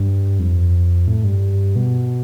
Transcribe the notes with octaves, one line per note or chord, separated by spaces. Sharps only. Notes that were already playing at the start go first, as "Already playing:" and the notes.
Already playing: G2
F2
A2
G2
B2